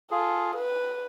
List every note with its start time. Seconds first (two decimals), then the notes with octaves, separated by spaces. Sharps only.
0.11 F4 G#4 A4
0.56 B4